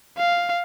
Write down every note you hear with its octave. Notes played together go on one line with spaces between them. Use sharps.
F5